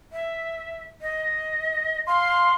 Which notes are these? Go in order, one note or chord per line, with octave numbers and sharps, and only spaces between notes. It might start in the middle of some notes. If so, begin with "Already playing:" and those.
E5
D#5
F5 C6